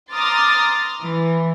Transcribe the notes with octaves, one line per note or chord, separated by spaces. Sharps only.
A#5 C6 D6 D#6 F6 A6
E3